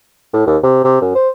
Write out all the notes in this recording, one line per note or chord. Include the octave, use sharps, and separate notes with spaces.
A2
D#2
C3
C3
F#2
C5